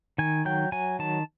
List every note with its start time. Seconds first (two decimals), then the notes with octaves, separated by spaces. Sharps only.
0.18 D#3 G#5
0.45 F#3 G5
0.72 F#3 G#5
0.99 D#3 A5